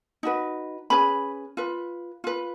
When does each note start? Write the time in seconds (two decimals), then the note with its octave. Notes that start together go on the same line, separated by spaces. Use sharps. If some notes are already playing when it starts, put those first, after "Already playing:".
0.23 D#4 F#4 B4
0.90 C#4 G#4 B4 B5
1.57 F4 B4
2.24 F4 B4